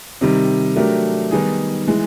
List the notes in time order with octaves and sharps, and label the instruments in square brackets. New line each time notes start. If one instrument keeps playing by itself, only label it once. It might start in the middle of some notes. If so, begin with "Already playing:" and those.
[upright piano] C3 D#3 G3
F#3 A3 D4 G4 A#4
D#3 G3 B3 D#4 G#4
E3 G#3